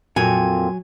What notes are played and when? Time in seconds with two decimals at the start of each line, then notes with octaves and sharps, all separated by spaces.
0.16 F2 A#2 F#3 G#5